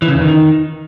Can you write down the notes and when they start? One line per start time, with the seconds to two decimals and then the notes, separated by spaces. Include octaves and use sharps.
0.02 E3
0.08 C#3
0.15 E2
0.21 D#3